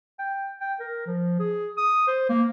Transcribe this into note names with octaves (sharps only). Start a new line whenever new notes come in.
G5
G5
A#4
F3
G#4
D#6
C5
A#3